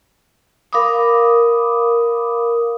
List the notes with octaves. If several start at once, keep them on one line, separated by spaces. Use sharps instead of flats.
A#4 F5 B5 D6 D#6